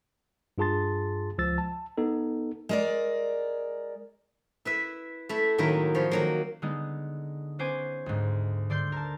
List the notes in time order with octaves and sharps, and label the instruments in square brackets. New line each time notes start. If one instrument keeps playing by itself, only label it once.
[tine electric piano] G2 F4 G#4 A5 C6 A6
C#2 F3 E6 A6
A5
B3 D#4 A4
[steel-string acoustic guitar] G#3 A#4 D5
[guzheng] E4 B4 E5
A3 E4 E5
A2 D#3 F#3 A#3 D#4 E4
F3 C#5 B5
D#3 F#3 A#3
[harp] D3 G#3 B3 D#4
B3 C#4 C5 G#5 D6
D2 G#2
D3 D5 C6 G6
A#4 A5